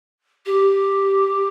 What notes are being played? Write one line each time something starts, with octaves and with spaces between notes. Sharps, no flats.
G4